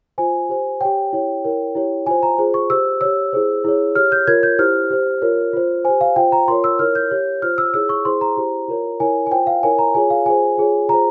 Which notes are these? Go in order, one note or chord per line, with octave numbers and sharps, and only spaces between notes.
F4 C5 G#5
G4 C5
G4 C#5 G5
E4 G4 C#5
E4 A#4 C#5
E4 G4 C#5
F4 C5 G#5
A#5
F4 G#4 C5
C#6
G4 C5 E6
G4 C#5 E6
E4 G#4 C5
E4 G#4 C#5
G4 C#5 F6
G6
F4 A#4 C#5 G#6
G6
E4 G4 C5 F6
G4 C5
F4 A#4 C#5
F4 C5
G4 C5 G#5
F5
F4 C5 G5
A#5
F4 A#4 C#5 C6
E6
E4 A#4 C#5 F6
G6
G4 C#5
F4 C5 F6
E6
E4 G#4 C#5 E6
C#6
E4 G#4 C5 C6
A#5
E4 G4 C5
F4 A#4 C#5
E4 A#4 C#5 G#5
G#5
F4 C5 G5
F5
E4 A#4 C#5 G#5
A#5
F4 G#4 C#5 G#5
F5
F4 G#4 C5 G#5
F4 G#4 C#5
F4 G#4 C5 A#5